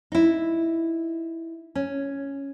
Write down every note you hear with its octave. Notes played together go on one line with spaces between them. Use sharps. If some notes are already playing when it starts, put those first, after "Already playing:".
D#4 E4
C#4